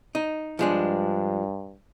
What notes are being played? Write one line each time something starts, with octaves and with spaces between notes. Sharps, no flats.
D#4
G2 F3 G#3 D4